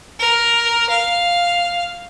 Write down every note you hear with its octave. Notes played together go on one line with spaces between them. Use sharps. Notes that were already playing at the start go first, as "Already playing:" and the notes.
A#4
F5